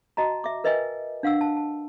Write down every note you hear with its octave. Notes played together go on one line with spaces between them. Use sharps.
F#4 D#5 A5 A#5
E5 D6
A#4 B4 D#5 E5 G5 G#5
D4 F5 F#5 E6
A5
A5